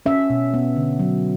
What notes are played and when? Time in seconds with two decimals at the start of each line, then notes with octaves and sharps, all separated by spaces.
0.06 C#4 E5
0.30 B2
0.54 B3
0.76 D3
0.99 F#3